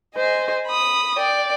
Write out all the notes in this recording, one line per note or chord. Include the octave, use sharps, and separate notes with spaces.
C5 D#5 G#5
B5 D#6
D5 G5